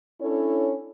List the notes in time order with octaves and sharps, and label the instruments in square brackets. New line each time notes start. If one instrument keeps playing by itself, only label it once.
[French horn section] C#4 D4 E4 A4 C#5